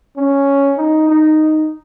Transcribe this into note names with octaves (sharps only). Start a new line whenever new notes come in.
C#4
D#4
D#4